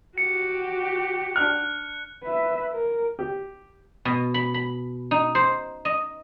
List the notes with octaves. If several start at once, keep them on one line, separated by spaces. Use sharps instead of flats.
F#4 G4 C#7
D4 F6 F#6
B4 E5
A#4
G4
B2
B5
B5
D#4
C5
D#5